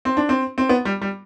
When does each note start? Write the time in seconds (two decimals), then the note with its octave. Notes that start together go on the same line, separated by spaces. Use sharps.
0.05 C4
0.17 D4
0.29 C4
0.58 C4
0.69 B3
0.85 G3
1.02 G3